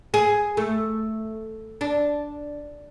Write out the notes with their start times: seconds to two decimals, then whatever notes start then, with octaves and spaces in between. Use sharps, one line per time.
0.14 G#4
0.57 A3
1.81 D4